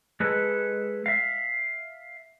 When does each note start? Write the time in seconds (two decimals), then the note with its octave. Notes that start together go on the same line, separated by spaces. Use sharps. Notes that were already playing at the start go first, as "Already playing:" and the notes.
0.20 G#3 G#4 A4 B4
1.06 E5 F5